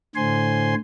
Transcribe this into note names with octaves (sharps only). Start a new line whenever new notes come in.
A2 D3 C5 G#5 C6